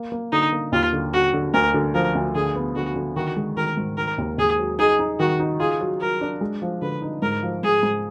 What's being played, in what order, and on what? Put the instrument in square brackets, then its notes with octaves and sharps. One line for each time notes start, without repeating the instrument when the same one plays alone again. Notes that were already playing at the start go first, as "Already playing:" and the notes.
Already playing: [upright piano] A#3
A#3
[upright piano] D3 [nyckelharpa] D#4
[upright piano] A#3
[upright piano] D#2 [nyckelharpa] F4
[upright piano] D3
[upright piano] D3 [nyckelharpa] F#4
[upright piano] D3
[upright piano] D2 [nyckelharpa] A#4
[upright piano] D3
[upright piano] F3 [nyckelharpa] A#4
[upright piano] D2
[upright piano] D3 [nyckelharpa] G#4
[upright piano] B3
[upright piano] D3 [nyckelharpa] F#4
[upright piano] D3
[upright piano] D#3 [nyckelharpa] F#4
[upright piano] G#3
[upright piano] D#3 [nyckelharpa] A#4
[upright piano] G#2
[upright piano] D#3 [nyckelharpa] A#4
[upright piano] D#2
[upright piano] D#2 [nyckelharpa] G#4
[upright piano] F#3
[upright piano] D#4 [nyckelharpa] G#4
[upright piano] D#4
[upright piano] D#3 [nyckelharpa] F#4
[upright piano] D#4
[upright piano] F4 [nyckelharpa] G#4
[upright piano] F#3
[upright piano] F#3 [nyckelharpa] A#4
[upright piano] D4
G#3
F3
[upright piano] D3 [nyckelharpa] B4
[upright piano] D#4
[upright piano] G#2 [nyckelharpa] A#4
[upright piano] F3
[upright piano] G#2 [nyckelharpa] G#4
[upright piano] G#2